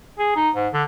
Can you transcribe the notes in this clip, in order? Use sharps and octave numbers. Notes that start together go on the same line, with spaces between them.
G#4
D#4
G#2
D3